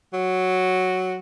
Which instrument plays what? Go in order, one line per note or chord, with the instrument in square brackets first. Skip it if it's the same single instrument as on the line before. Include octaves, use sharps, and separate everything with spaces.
[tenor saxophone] F#3